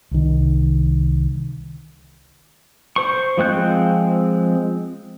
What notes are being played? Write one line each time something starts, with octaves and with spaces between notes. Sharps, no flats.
C2 D#3
C5 C#6
F3 G#3 C4 F#6 G6